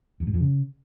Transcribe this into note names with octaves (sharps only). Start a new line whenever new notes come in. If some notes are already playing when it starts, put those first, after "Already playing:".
E2
G#2
F2
C#3